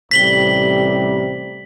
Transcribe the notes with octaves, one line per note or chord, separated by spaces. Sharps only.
A1 C3 G3 B6 F#7 G7